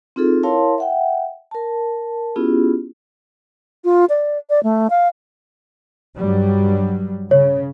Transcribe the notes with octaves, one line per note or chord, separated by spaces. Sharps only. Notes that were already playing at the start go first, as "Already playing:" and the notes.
C4 D#4 F4 G#4 A4
E4 A#4 C#5 F5 A5 C6
E5 F#5 G5
A#4 A5
B3 C#4 E4 F4 G4 G#4
F4
D5
D5
A3
F5
G2 F#3 G3
C#3 C#5